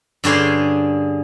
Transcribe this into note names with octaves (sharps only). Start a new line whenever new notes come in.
G2 D3 C#4 G#4 C6